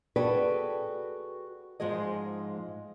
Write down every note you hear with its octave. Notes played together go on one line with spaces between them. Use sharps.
F#4 G#4 A4 B4 D5 G5
G#2 F3 G#3 G#4 D#5